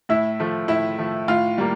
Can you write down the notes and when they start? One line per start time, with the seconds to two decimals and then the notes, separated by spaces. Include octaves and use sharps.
0.09 A2 E4 E5
0.40 F3 A3
0.68 A2 E4 E5
0.99 F3 A3
1.28 A2 F4 F5
1.58 G3 A#3